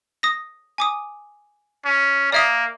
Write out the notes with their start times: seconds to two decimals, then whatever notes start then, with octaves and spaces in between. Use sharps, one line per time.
0.23 D#6 A#6
0.78 G#5 D6 D#6
1.85 C#4
2.32 A#3 D5 E5 D#6